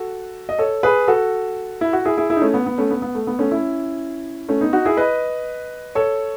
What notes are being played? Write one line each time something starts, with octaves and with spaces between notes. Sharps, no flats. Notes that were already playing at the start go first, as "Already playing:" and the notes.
Already playing: F#4 A4
D#5
A4 C#5
G#4 B4
F#4 A4
E4
F#4
E4 G#4
E4 G#4
E4 G#4
D#4
A3 C#4
B3
B3
A3 C#4
B3
B3
A3
B3
A3 C#4
C#4 E4
A3 C#4
B3 D#4
D#4 F#4
E4 G#4
B4 D#5
A4 C#5